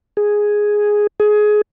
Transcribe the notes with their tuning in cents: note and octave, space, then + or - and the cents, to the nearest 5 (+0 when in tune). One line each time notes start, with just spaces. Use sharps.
G#4 +0
G#4 +20